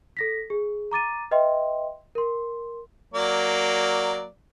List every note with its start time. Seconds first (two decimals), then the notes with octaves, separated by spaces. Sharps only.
0.17 A4 A#6 B6
0.50 G#4
0.91 A#5 D6 A6 D#7
1.31 B4 D#5 E5 G5 C6
2.15 A#4 C6
3.14 F#3 A#3 D5